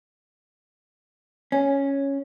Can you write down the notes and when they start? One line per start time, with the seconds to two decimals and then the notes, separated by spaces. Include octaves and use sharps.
1.52 C#4